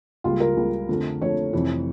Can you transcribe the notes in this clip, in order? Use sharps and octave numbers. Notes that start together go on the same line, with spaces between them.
C#2 C#3 G3 A#3 F4
A#4
C#2 C#3 G3 A#3
F2 D3 F3 A3
F2 D3 F3 A3 C#5
F1 F2 E3